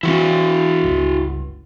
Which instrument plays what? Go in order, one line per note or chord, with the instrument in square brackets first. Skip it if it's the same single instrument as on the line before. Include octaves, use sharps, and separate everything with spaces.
[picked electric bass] E3 C4 [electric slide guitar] E4 F#4
[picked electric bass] G1 C#2